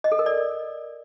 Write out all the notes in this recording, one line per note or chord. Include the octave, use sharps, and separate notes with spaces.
D#5
A4
A#4
D5